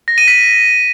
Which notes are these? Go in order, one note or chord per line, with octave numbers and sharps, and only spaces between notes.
A#6
D#7
B6